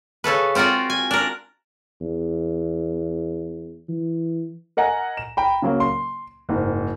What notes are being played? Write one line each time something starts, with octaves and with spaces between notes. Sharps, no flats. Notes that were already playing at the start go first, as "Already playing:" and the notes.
C#3 C#4 A4 B4
C4 F4 F#4 A#4 D5
G#5
D4 A#4
E2
E3
A#4 D#5 F#5 G#5 A#5
E7
G5 A#5 B5
C#3 F#3 A#3
C6
F#1 G#2